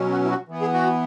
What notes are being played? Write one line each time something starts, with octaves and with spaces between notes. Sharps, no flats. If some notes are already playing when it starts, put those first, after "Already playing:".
Already playing: B2 F#3 C#4
F#4
E4
F#4
E3 B3
G#4
F#4